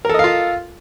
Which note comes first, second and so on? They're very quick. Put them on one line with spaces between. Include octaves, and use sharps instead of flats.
A#4 A4 D#5 F5 F4